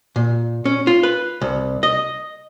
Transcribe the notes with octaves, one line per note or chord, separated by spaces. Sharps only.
A#2
C#4
F4
B4
C2
D#5